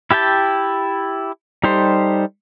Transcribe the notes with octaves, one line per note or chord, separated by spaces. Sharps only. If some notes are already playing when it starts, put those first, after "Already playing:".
E4 G4 E5 G5 A5
G3 D#4 G4 A4 C5